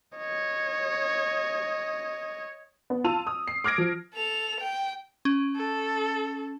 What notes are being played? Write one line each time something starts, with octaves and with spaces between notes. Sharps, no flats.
C#5 D#5
B3
F4 A5 E6 D#7 F7
D#6
C7
D6 F6 G#6 A#6 D7
F3
A4 F7
G5
C#4
A4